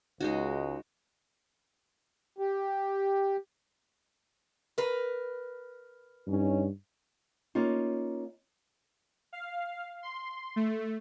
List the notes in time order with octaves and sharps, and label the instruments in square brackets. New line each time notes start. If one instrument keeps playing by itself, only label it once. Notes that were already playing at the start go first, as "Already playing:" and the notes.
[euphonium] C#2 [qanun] G#3 D#4 F#4
[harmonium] G4
[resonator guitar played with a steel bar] A#4 B4
[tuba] G2 [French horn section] C#4 D#4
[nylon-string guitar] A#3 C#4 D#4 F4
[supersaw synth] F5
C6
A3